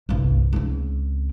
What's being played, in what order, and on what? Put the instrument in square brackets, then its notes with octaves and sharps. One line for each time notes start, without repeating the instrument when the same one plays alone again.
[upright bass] G1 C2
C#2 C4